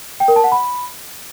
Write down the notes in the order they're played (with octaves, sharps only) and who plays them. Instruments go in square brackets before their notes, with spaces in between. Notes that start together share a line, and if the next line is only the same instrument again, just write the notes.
[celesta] G5
A#4
A5
F#5
B5